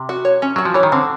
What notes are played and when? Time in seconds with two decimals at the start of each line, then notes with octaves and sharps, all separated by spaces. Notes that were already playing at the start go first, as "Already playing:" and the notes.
Already playing: C3
0.09 F#4
0.25 C#5
0.42 C#4
0.56 F#3 F#4
0.65 F3
0.74 E3 C#5
0.83 D#3
0.92 D3 C4